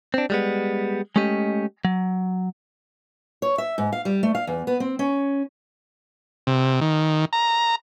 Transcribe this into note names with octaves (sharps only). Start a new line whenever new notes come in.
C4 D4
G3 G#3 B3
G#3 A3 C#4 G4 D#5
F#3
C#5
E5
G#2
F5
G3
A3
F5
E2
B3
C4
C#4
C3
D#3
A#5